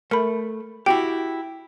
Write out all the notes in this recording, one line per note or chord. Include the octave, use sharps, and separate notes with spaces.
A3 A#4 B5
E4 F#4 G4 G5